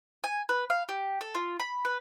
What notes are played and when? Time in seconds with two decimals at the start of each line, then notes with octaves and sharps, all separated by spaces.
0.24 G#5
0.49 B4
0.70 F5
0.89 G4
1.21 A4
1.35 F4
1.60 B5
1.85 B4